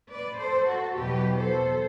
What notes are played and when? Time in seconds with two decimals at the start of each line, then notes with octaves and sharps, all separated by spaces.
0.12 B4 D5
0.40 A4 C5
0.68 F#4 A4
0.97 E2 B2 F#3 G4 B4
1.38 A4 C5